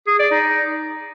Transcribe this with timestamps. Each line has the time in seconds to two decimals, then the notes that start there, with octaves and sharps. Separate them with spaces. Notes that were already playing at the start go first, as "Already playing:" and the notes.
0.07 G#4
0.19 D5
0.31 D#4